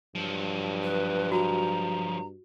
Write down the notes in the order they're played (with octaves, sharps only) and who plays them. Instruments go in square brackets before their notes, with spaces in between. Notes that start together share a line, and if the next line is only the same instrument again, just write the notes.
[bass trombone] G2 [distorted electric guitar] F3 F#3
[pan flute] B4
[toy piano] F#4 [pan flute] A#5